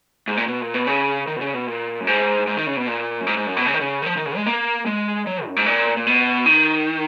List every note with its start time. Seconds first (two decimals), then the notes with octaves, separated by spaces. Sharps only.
0.28 G#2
0.37 A#2
0.47 B2
0.61 A#2
0.74 B2
0.87 C#3
1.27 D#3
1.36 B2
1.41 C#3
1.54 B2
1.67 A#2
2.00 F#2
2.07 G#2
2.47 G#2
2.56 D#3
2.67 C#3
2.77 B2
2.87 A#2
3.21 F#2
3.27 G#2
3.37 G#2
3.47 F#2
3.57 B2
3.66 C#3
3.74 D#3
3.81 C#3
4.02 D#3
4.06 F3
4.17 D#3
4.26 C#3
4.36 G#3
4.46 A#3
4.86 G#3
5.27 F#3
5.46 F#2
5.56 G#2
5.66 A#2
5.97 A#2
6.07 B2
6.46 D#3